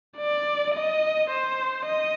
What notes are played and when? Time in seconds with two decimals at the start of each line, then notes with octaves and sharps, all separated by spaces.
0.18 D5
0.75 D#5
1.30 C5
1.86 D#5